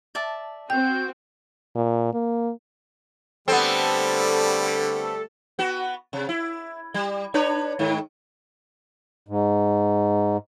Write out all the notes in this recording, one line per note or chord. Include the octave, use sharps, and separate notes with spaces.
D5 E5 A5
C4 F#4 G5 G6
A#2
A#3
D3 G3 A3 B3 C4 A4
B3 F#4
C3
E4
G3
D4 B4 C#5
G#2 D#3
G#2